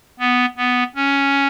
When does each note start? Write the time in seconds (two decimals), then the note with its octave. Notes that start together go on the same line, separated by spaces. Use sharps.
0.20 B3
0.57 B3
0.95 C#4